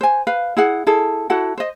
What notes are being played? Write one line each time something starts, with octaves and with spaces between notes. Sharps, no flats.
C5 G#5
B4 F5
E4 G#4 F#5
E4 G#4 A4
E4 F#4 A4 F#5
C5 D#5